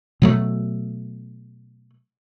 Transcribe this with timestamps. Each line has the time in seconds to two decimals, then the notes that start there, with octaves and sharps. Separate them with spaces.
0.22 B2 F#3 A3